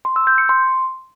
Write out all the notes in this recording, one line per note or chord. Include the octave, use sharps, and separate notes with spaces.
C6
E6
G6
C#7
C6